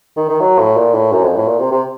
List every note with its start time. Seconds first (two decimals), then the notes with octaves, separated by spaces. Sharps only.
0.17 D#3
0.29 D#3
0.41 F#3
0.59 A2
0.77 A#2
0.94 A2
1.12 F#2
1.24 F2
1.36 A2
1.48 A#2
1.59 C3
1.72 C3